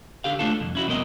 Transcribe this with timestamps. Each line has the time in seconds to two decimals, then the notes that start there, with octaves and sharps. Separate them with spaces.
0.24 D3 G4 F5
0.39 A3 B3 D4 F4 A4
0.60 C2 F2
0.75 C#4 E4 F#4
0.86 C2 F2 C3 B3 A#4 D#5